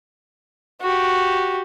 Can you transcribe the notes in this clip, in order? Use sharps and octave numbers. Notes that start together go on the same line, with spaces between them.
F#4 G4